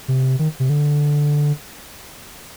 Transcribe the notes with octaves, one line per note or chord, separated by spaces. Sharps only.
C3
D#3
C3
D3